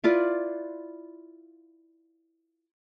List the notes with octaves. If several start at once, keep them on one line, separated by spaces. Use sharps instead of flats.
E4 F4 B4 D5